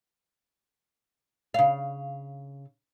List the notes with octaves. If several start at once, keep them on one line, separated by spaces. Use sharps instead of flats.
C#3 F5